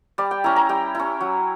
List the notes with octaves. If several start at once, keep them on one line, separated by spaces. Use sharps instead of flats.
G3 D5
G5
C#4 E4 A#5
A#5
G3 G5
C#4 E4
F#3